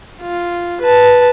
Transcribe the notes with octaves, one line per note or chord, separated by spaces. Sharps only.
F4
B4 A5